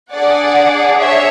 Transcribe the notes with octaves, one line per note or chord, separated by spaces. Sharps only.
D4 G#4 D5 F#5
C#5 E5